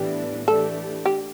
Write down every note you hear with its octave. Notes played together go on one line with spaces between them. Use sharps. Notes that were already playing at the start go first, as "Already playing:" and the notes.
Already playing: A2 E3 G3 B3 D4 G4
E3 A3 D4 G4 A4
G4